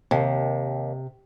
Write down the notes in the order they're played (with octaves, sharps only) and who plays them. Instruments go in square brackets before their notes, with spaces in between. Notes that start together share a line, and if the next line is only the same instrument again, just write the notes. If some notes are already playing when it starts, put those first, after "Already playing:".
[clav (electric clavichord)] D#2 [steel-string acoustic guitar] C3